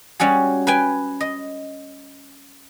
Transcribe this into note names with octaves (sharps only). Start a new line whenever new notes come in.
G3 C#4 F#4 G#4
B4 G5 G#5
D#5